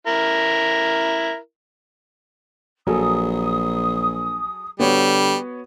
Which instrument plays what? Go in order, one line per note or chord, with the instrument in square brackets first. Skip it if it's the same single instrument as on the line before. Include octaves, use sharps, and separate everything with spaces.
[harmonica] E4 A#4
[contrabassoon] A#1 [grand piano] F#3 G#4 A4 [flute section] D#6
[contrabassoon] D3 [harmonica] G3 [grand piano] B3 F#4 C#5